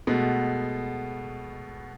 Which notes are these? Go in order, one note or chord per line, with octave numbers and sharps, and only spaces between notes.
B2 G#3 A3 B3